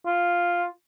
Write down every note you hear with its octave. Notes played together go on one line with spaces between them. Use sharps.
F4